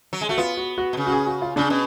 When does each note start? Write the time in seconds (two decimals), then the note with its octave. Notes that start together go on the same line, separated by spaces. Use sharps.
0.13 F#3
0.21 G#3
0.29 A3 F#4
0.38 B3 F4
0.57 F#4
0.78 F#4
0.93 B2
0.97 C#3
1.07 F#4
1.12 G#4
1.27 F#4
1.42 F4
1.56 C#3 D4
1.70 B2